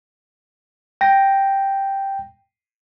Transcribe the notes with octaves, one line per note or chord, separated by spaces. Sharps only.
G5 A#6